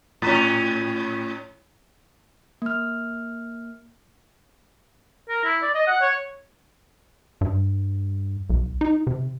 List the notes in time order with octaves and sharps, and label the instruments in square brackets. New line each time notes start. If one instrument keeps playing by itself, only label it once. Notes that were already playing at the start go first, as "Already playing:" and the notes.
[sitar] A2 C#4
[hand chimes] A#3 F6
[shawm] A#4
E4
D5
D#5
F#5
C#5
[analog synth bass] G2
B1
D#4
C3